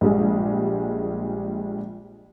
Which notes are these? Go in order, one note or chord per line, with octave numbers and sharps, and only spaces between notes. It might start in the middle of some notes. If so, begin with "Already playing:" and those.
A#1 G3 G#3